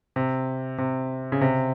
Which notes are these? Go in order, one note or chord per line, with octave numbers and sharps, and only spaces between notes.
C3
C3
C#3
C3